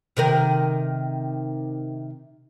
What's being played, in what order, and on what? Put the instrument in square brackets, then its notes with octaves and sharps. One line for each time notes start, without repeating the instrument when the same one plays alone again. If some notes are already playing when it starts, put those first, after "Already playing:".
[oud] C3 D#3 A#4